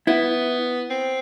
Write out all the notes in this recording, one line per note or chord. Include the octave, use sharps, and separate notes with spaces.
B3 E4
C4